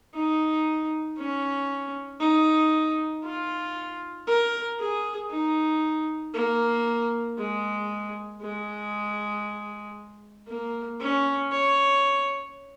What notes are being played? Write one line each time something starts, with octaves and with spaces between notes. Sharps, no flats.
D#4
C#4
D#4
F4
A#4
G#4
D#4
A#3
G#3
G#3
A#3
C#4
C#5